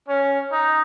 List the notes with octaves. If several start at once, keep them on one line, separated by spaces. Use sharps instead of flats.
C#4
D#4